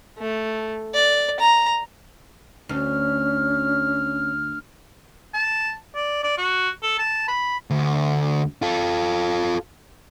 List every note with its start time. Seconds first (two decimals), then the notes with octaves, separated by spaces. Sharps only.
0.18 A3
0.94 D5
1.40 A#5
2.69 D2 C#4 F6
5.34 A5
5.95 D5
6.23 D5
6.37 F#4
6.83 A4
6.99 A5
7.28 B5
7.70 D2
8.62 F4 A4